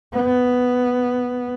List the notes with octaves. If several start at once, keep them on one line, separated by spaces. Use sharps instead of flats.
B3